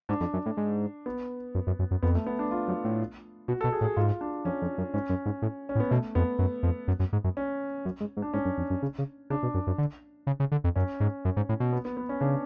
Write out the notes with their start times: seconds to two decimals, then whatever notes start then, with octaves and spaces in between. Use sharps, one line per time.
0.09 G#2 D4
0.20 F2
0.33 F#2
0.46 A2
0.57 G#2
1.06 B3
1.55 F#2
1.67 F#2
1.79 F#2
1.91 F#2
2.03 F2 B3
2.15 A3
2.26 B3
2.39 D4
2.51 F4
2.68 F#2
2.84 A2
3.48 B2 F#4
3.61 A4
3.64 B2
3.72 G#4
3.81 A2
3.84 G#4
3.97 G#2 F4
4.21 D4
4.45 F2 C#4
4.62 F2
4.78 F#2
4.94 G#2 C#4
5.09 F#2
5.26 G#2
5.42 A2
5.69 C#4
5.75 A2
5.80 B3
5.90 B2 A3
6.15 F2 B3
6.39 F#2
6.63 F2
6.88 F#2
6.99 F#2
7.13 G#2
7.24 F#2
7.37 C#4
7.85 F#2
8.00 G#2
8.17 G#2
8.22 D4
8.34 G#2 C#4
8.45 F#2
8.57 F2
8.70 F#2
8.82 C#3
8.98 C#3
9.30 C#3 D4
9.43 B2
9.54 F#2
9.67 F#2
9.78 D3
10.27 C#3
10.40 C#3
10.52 D3
10.64 F2
10.76 F#2 C#4
11.00 G#2
11.25 F#2
11.37 G#2
11.49 A2
11.60 B2
11.73 B3
11.85 B3
11.97 B3
12.09 C#4
12.21 C#3 D4